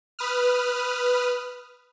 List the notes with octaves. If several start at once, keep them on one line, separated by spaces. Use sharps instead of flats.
B4 D#6 F6